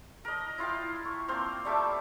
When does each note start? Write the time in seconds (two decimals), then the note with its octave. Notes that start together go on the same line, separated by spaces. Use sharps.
0.25 A#4 D#5
0.58 E4 F4 F5 G5
1.05 C#6
1.28 A#3 C4 C5 F5
1.65 G3 A3 E5 D6